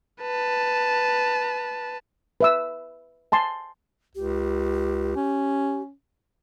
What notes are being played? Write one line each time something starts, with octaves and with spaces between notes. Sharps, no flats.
B4 A5
B4 E5 E6
G#5 A5 C6
C#2 G4
C#4